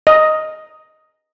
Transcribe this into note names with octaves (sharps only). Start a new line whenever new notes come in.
D#5